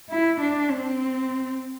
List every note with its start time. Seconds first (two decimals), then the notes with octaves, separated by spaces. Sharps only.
0.10 E4
0.41 D4
0.70 C4